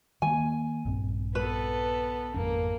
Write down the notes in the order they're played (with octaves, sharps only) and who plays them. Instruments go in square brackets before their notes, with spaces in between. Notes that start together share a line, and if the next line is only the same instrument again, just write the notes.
[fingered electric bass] D#3 A#3 [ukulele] G#5
[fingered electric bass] A#1 G2 C4
[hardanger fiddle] B3 A4 [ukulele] B4
[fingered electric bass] G#1 F2 C#4 [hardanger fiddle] A#3